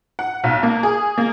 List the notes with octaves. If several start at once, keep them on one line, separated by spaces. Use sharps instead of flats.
F#5
B1
A#3
G#4
A#3